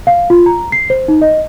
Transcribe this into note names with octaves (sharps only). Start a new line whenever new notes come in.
F5
F4
A#5
C7
C5
D#4
D#5